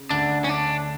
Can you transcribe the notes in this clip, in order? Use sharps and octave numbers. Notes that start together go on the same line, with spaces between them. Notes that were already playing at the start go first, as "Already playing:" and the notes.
Already playing: C#3
D2 D3 D4
C#4
D4